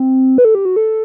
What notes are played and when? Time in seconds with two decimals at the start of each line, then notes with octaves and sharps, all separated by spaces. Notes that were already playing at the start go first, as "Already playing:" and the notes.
Already playing: C4
0.38 B4
0.45 A4
0.55 G4
0.65 F#4
0.76 A4